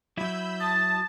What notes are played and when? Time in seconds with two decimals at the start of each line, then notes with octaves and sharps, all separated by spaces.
0.17 F#3 E4 B5 E6 G6
0.60 A5 D#6 A6